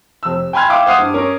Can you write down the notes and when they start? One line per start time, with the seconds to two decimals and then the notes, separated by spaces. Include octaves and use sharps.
0.23 F1 E6
0.53 G5 G#5 B5 C6 F6 G#6
0.68 E5 F5 G5 D6
0.86 C5 E5 F#5 D#6 F6 C7
0.98 G2
1.14 C#4 A#4 C#5